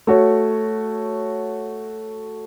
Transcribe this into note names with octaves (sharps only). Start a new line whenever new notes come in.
A3 F#4 C#5